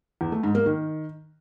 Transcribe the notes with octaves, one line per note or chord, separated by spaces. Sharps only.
E2
A3
G#2
A#3
D#3